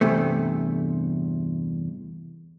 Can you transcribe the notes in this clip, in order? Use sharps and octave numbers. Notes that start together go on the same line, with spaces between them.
E2 G2 C3 A3